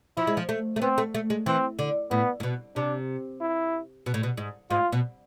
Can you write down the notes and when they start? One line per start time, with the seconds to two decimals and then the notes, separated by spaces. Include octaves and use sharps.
0.17 F3 E4
0.27 G#3
0.37 F3
0.49 A3
0.76 A3
0.81 B3 C4
0.98 A3
1.14 A3
1.30 G#3
1.46 E3 C4
1.79 D3
2.11 A2 B3
2.40 A2
2.43 B2
2.76 C3 D4
3.41 E4
4.06 B2
4.14 A2
4.23 B2
4.37 G#2
4.70 G#2 F4
4.92 B2